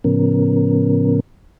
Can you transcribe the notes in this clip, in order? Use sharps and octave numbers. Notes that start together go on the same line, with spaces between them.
A2 C#3 F3 B3 C#4 A#4